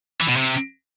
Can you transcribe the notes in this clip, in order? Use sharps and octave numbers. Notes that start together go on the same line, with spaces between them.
E3
B2
C3